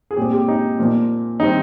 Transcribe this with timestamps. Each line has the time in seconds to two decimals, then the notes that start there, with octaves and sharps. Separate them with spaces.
0.11 G#4
0.17 A#2 G#3 C4 G4
0.33 G4
0.48 D#4
0.79 A#2 F3 A#3
1.39 D#3 G3 C4 D#4